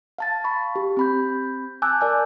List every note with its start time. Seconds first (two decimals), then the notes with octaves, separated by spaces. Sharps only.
0.18 F5 A5 A6
0.44 B5 C#6
0.76 G4
0.97 C4 B5 G6
1.82 G#5 A5 D6 E6 F#6 G6
2.01 A#4 D5 G#5 A5